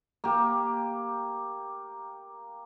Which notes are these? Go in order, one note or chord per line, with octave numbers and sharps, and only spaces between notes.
A#3 G4